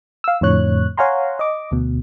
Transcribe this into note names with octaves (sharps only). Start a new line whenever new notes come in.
F5 E6
F2 A2 D3 C#5 F#6
C#5 F5 F#5 G#5 A#5 C6
D#5 D6
D2 B2